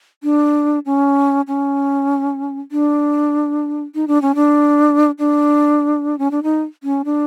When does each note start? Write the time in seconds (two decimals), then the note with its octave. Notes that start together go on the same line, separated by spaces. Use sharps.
0.23 D4
0.86 C#4
1.48 C#4
2.72 D4
3.95 D#4
4.08 D4
4.22 C#4
4.35 D4
5.19 D4
6.19 C#4
6.31 D4
6.43 D#4
6.83 C#4
7.05 D4